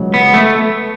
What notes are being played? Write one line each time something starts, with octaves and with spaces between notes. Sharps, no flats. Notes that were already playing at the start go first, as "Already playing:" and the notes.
Already playing: C#2 C#3 F#3
B3
A3